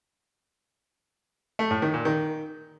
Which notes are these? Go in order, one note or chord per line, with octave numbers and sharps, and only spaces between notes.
A3
A2
D#3
A#2
D#3